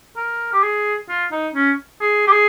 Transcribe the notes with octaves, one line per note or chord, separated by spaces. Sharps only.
A#4
G4
G#4
F4
D#4
C#4
G#4
G4
G#4